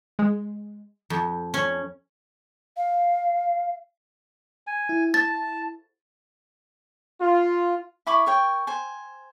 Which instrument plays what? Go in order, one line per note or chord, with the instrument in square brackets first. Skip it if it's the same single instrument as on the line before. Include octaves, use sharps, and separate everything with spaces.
[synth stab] G#3
[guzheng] F2
C#4
[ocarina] F5
[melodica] G#5
[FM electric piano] E4
[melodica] A5 [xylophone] A6
[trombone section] F4
[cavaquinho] E4 B5 C#6 D6
A#4 C#5 G5
C5 G#5